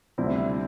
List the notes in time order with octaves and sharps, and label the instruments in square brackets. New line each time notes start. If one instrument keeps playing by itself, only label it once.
[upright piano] D2 D3 G3 C4 E4